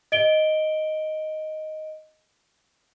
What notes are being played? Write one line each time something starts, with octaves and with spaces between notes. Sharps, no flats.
D#5 D7 G7